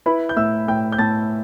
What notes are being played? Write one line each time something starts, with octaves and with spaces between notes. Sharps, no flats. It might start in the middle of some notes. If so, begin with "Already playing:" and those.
E4 B4 B5
G6
A2 E5 E6
A2 G5 G6
G6
A2 A5 A6